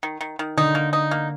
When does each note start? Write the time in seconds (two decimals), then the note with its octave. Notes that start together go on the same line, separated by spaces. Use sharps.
0.03 D#3
0.21 D#3
0.39 D#3
0.57 D3 D#4
0.75 A#3
0.93 D#4
1.11 A#3